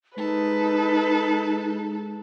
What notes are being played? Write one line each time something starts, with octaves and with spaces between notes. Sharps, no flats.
G#3 D#4 A4 B4